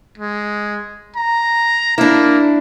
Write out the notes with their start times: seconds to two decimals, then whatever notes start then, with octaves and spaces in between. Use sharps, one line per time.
0.18 G#3
1.16 A#5
1.98 A#3 D4 E4